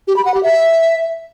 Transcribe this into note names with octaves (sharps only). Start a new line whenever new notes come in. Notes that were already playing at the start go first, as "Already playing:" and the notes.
G4
B5
F#5
G4
E5